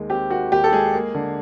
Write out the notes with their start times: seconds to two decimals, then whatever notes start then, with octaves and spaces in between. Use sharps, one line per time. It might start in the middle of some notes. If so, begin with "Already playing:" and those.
Already playing: D#2 D#3 G#3
0.10 C4 G4
0.30 D#3 F#4
0.52 D#2 G4
0.64 A4
0.73 G#3 G#4
0.94 A#3
1.14 D3